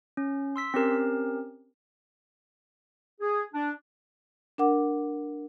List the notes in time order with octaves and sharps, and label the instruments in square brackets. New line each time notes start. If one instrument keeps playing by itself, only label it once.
[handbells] C#4
C6 E6 B6
C4 C#4 G4 A#4
[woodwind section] G#4
D4
[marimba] D4 A#4 F#5 D6